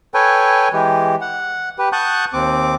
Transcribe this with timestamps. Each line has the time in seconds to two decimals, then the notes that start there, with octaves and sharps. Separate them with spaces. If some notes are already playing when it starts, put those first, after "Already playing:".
0.14 A4 B4 C#5 G5 G#5
0.73 E3 G#3 G4
1.21 F#5
1.79 G4 B4
1.92 F#5 A5 C#6 D#6 F#6 G6
2.33 D#2 C4 D6